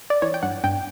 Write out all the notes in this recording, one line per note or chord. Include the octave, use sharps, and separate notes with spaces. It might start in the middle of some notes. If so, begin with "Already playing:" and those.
D5
E3 C#5
G5
G2 F#5
G2 G5